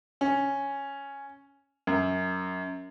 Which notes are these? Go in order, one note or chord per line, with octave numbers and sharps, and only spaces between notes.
C#4
F#2